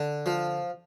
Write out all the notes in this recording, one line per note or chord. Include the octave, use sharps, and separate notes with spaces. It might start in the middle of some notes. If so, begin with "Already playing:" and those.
Already playing: D3
F3